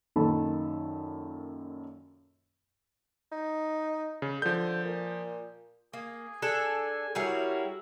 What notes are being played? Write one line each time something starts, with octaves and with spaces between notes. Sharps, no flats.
F#2 A#2 D#3 A4 B5
D#4
C#3
D3 F3 G6
A#2
A#3 G#4
D4 G#4 A4 G#5
G3 E4 F#4 G#4 A#4 C#5 E5